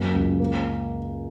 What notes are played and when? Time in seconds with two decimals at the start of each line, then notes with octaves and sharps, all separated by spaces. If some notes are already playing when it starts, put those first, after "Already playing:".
Already playing: F#2 A#3
0.14 C#2
0.40 A#3